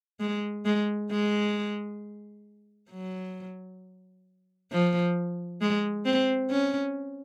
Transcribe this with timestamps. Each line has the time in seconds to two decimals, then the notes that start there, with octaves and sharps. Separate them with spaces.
0.20 G#3
0.65 G#3
1.10 G#3
2.90 F#3
4.71 F3
5.61 G#3
6.05 C4
6.50 C#4